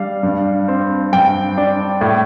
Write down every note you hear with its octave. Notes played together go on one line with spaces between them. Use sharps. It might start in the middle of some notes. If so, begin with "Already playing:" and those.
Already playing: G3 D4 F5
G2
C4
G2 G5
D4
A2